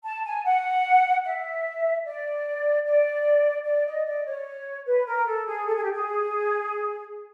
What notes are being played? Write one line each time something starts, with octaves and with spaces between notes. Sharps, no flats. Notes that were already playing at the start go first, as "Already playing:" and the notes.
A5
G#5
F#5
E5
D5
D5
D5
D#5
D5
C#5
B4
A#4
A4
G#4
A4
G#4
G4
G#4